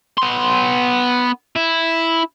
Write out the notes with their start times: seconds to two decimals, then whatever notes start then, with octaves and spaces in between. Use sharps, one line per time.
0.17 B3 C6
1.56 E4